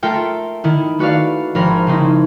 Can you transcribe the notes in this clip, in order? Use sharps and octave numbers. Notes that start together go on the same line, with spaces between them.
A3 F4 A4 A#4 E5 G5
D#3 E4
A3 F#4 B4 D5 F5
G#1 F3 A#4 B5
C#3 C4 D#4 E4